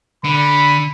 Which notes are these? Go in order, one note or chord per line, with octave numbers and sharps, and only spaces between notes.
D3 B5